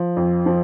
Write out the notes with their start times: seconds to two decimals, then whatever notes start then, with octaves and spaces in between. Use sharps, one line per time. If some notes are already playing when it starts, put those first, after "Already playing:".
Already playing: F3
0.17 F2
0.46 F3